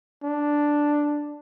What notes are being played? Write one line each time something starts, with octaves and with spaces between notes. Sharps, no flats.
D4